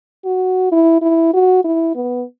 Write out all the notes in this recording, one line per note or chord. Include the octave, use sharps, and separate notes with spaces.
F#4
E4
E4
F#4
E4
B3